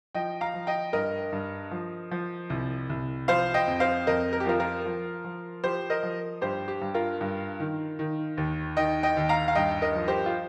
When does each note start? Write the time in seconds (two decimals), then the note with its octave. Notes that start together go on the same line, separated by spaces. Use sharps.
0.15 F3 D#5 G5
0.41 F5 A#5
0.54 F3
0.67 D#5 G5
0.93 G2 A#4 D#5
1.32 G2
1.71 F3
2.11 F3
2.50 C2
2.89 C2
3.28 F3 C5 F5
3.54 D#5 G5
3.67 F2
3.80 C5 F5
4.07 F2 A#4 D#5
4.33 A#4
4.40 G4
4.46 F3 F4 A#4
4.60 F4 A#4
4.86 F3
5.24 F3
5.64 F3 G4 C5
5.90 A#4 D#5
6.03 F3
6.41 G2 G4 C5
6.68 G4
6.81 G2
6.94 F4 A#4
7.21 G2
7.60 D#3
7.99 D#3
8.37 D#2
8.77 D#3 D#5 G5
9.03 D#5 G5
9.16 D#2
9.29 F5 A#5
9.48 F5
9.55 G2 D#5 G5
9.82 A#4 D#5
9.95 F3
10.08 G4 C5
10.26 F4